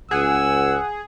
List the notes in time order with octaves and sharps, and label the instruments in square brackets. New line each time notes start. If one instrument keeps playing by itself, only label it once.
[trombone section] C#2 [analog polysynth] G#4 [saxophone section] F#5 [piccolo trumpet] E6